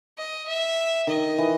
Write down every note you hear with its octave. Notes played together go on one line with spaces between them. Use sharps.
D#5
E5
D#3 D#5
E3